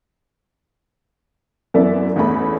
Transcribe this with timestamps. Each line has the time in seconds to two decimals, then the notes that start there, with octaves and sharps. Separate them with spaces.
1.74 F#2 E3 B3 A#4 D5 E5
2.16 A1 E2 A3 B5